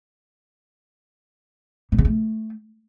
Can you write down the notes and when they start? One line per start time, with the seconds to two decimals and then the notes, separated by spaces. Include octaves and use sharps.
1.92 B2
1.98 C#3
2.05 A3